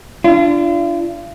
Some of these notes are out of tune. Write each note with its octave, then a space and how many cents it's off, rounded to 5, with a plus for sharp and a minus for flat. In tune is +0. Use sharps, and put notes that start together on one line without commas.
D4 +0 F4 -40